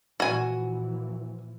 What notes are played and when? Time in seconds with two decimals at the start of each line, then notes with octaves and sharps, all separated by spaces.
0.20 A#2 E3 F3 F#4 G#5